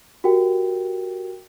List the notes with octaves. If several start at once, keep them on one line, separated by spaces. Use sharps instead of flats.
F#4 G4 A#4 G5